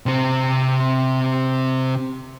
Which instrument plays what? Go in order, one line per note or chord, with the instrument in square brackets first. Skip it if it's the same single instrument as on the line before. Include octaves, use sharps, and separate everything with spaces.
[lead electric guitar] C3 C4